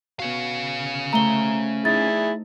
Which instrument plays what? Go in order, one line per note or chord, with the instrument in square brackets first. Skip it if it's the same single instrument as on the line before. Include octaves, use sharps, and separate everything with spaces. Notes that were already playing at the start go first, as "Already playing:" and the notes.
[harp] B2 F#4 [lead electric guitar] C#4 F5
[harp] A3 C5 [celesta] A#5 G7
[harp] D#4 [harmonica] E4 G#4 [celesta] A6